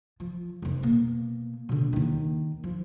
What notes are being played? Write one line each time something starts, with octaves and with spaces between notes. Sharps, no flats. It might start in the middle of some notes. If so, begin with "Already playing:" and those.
F3
F1 F2
B2 A#3
B2 D3
D#2 D#3
F3